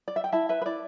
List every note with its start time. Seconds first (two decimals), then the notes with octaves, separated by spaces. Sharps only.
0.08 D5
0.16 E5
0.24 G5
0.32 E4 E5 A5
0.49 B4 E5
0.62 B4
0.66 E4 D5